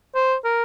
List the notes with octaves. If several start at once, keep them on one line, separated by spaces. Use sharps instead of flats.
C5
A#4